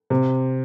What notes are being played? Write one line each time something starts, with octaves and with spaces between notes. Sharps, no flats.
C3